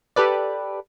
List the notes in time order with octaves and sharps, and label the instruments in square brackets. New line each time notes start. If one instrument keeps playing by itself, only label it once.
[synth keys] G4 A4 B4 D5